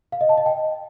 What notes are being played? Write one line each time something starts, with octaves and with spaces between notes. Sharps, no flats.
F5
D#5
A5
D#5
G5